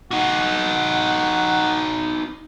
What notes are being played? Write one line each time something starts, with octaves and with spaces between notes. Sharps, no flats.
D#4 F#4 F#5